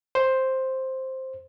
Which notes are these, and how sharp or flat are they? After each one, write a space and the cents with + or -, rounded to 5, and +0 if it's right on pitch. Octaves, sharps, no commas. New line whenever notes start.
C5 +5